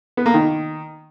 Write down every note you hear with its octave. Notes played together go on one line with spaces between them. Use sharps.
B3
A#3
D#3